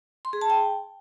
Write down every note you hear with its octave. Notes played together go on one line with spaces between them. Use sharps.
C6
G#4
A5
G5